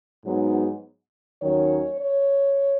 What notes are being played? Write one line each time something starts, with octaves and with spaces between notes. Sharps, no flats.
G#2 F#3 B3 D#4
D#2 D#3 F#3 C#4 C#5
C#5